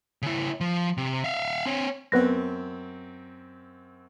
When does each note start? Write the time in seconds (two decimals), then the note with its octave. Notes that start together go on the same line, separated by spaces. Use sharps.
0.22 C#3 E4
0.60 F3
0.97 C3
1.24 E5 F5
1.66 C4 C#5
2.12 F#2 B3 C4 B4 A#6